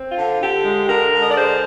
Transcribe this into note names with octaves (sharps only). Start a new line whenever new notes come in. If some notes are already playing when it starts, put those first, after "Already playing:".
Already playing: C4
F4
D3
D3 G4
G#3
D3 A#4
D3
D#5
D5
G#3 C5